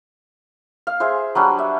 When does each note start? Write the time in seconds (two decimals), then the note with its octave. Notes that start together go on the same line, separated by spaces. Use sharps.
0.87 F5
1.00 G#4 C5 E5
1.35 F#3 G3 D4
1.59 E5